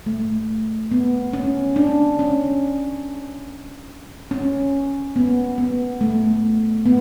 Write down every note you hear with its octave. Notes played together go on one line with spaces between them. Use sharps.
A3
B3
C#4
D4
C#4
C#4
B3
B3
A3
B3